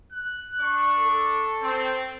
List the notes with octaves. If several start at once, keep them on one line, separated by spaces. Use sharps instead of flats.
F#6
D4 C#6
A4
C4